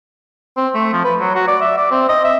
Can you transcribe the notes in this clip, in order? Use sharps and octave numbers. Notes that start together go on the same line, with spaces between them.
C4
A3
F3
B4
F#3
F#4
D5
E5
D5
C4
D#5
E5